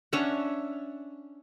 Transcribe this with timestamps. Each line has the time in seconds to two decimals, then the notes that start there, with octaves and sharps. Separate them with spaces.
0.13 C#4 D4 E5 F#5